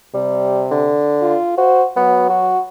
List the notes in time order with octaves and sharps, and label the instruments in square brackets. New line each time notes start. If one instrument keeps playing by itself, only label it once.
[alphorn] C3 [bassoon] G3
[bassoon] D3
[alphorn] F4
[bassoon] F#4 [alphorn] C5
[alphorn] F#3 [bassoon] B3
[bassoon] F#4